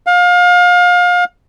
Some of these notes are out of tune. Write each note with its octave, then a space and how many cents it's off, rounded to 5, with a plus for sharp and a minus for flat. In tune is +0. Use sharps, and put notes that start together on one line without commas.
F5 +30